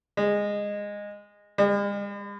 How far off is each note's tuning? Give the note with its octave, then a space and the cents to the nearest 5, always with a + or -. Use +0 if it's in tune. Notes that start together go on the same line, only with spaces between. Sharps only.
G#3 -15
G#3 -45